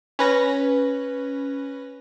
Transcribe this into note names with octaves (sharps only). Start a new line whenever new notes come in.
C#4 B4 A#6